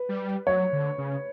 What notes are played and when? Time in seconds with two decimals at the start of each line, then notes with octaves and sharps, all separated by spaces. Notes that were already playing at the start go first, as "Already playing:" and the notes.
Already playing: B4
0.09 G3
0.47 F#3 C#5
0.73 D3
0.98 C#3